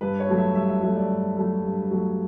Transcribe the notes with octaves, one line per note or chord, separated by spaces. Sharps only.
G2 B4
C#5
F#3 A3
E5
G2 E5
E5
F#3 A3 E5
D5
G2
F#3 A3
G2
F#3 A3